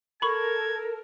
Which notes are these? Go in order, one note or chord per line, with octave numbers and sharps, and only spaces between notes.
A4 A#4 B5 C#6 G#6